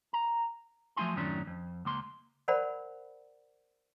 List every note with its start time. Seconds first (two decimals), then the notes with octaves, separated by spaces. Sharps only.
0.13 A#5
0.97 F3 F#3 A3 E4 G#5 C6
1.16 F#2 A2 D#3 F#3 C#4 D4
1.47 F2
1.85 C#2 A#3 C6
2.48 A#4 C5 D5 F#5 A5 B5